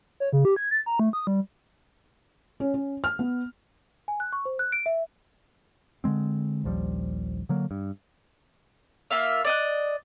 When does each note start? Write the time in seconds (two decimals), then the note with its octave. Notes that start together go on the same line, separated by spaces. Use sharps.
0.20 C#5
0.33 C#3
0.45 G4
0.56 G#6
0.71 A6
0.86 A#5
1.00 A3
1.13 D#6
1.27 G3
2.60 C#4
2.74 C#4
3.04 F6
3.19 B3
4.08 G#5
4.20 F#6
4.33 C#6
4.45 C5
4.59 F#6
4.72 D7
4.86 E5
6.04 D3 F3 G#3 C4
6.64 A#1 D#2 F3 G3
7.49 D3 F#3 A#3
7.71 G2
9.11 A#3 F4 E5 F5
9.45 D5 D#5 F#6